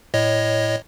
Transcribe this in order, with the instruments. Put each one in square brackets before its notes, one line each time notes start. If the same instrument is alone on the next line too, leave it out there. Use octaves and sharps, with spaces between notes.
[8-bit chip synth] A2 C#5 D#5